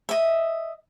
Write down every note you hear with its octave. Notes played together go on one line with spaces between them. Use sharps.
D#5 E5